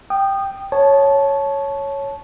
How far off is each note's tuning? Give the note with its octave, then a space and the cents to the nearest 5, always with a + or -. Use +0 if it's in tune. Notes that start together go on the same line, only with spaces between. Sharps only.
G5 +0 D#6 -25
C#5 +0 A5 -15